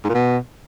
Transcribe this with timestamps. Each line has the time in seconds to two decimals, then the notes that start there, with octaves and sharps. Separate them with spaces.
0.04 G#2
0.09 A#2
0.14 B2